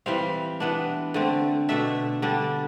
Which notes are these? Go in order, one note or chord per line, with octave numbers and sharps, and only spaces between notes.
E3 G3 C4 F5
E3 B3 D4
D3 A3 C4
B2 A3 D4 E5
D3 G3 D4